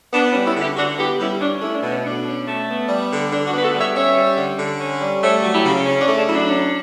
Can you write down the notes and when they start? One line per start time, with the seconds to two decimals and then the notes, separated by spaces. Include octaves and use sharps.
0.13 B3 D4
0.30 C#4 E4
0.35 G3
0.45 C#4 E4
0.55 D3
0.60 E4 G4
0.76 D3 D4 F#4
0.98 B3 E4 G4
1.19 G3 C#4 E4
1.40 C#4 D4
1.62 A3 E4
1.72 D4
1.83 B2
1.88 C#4
2.04 B2 D4
2.25 C#4
2.47 A3
2.68 B3
2.88 G3
3.09 D3
3.31 D3 D4
3.47 D4 F#4
3.53 B3 B4
3.62 F#4 A4
3.74 G3
3.79 C#5 E5
3.94 C#4 C#5 E5
4.17 G3
4.37 D3
4.59 D3
4.80 C#4
5.01 G3
5.22 A3 C#5 E5
5.43 F#3
5.53 E4 G4
5.65 C#3
5.85 C#4
6.01 D4
6.07 A3
6.18 D4
6.26 E4
6.29 F#3 D4
6.49 C#4